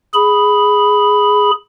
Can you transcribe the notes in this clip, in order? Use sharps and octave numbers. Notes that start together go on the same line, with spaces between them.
G#4 B5